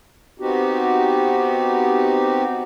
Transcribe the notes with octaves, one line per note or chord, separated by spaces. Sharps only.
B3 C4 D#4 F#4 G4